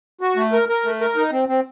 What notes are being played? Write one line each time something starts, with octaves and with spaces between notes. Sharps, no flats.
F#4
A3
A#4
A#4
A3
A#4
D#4
C4
C4